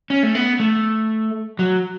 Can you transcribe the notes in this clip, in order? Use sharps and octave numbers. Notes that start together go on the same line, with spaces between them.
C#4
A3
B3
A3
F#3